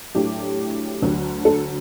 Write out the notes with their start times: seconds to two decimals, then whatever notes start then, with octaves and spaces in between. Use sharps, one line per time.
0.15 A2 F#3 A3 D4 G4
1.02 D2 D3 F#3
1.45 A4